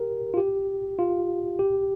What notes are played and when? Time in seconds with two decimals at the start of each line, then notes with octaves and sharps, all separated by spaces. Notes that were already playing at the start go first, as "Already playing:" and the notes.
Already playing: G4 A#4
0.34 F4
0.37 G4
0.99 F4
1.59 G4